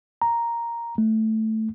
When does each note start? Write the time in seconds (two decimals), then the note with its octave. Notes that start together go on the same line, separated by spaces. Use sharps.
0.22 A#5
0.98 A3